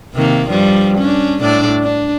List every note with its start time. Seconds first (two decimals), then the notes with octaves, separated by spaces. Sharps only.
0.14 C3 D#3 A#3
0.48 G2 F3 G3
0.98 C#4 D4
1.40 A2 D4 D5
1.83 D4